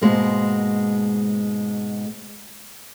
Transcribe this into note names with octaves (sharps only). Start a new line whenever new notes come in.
G#2 B2 D3 G#3 A#3